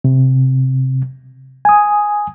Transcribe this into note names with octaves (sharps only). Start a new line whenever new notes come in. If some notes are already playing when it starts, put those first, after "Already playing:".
C3
G#5 D#6